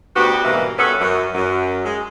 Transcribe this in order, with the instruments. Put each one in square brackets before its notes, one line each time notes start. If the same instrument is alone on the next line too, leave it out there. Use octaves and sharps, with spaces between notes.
[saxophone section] D2 B3 F#4 G4
G#2 B2 E3 G3 A#3
G2 B3 C#4 F#4 A4
F#2
F#2
G#3